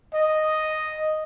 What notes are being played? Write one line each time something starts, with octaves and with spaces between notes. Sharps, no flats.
D#5